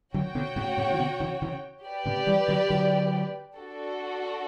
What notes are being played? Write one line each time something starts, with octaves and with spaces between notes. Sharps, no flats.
D3 F#3 F#4 C#5 G5
B2 D3
A2 C#3
A2 C#3
E3
B2 D3
C#3 E3
C#3 E3
G4 B4 D5
A2 C#3
E3 G3
D3 F#3
D3 F#3
D4 F#4 A4